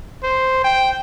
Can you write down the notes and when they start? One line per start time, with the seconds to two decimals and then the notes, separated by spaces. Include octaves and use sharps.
0.23 C5
0.64 G5